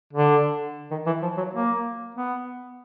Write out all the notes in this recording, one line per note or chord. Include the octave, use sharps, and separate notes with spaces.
D3
D#3
E3
F3
F#3
A#3
B3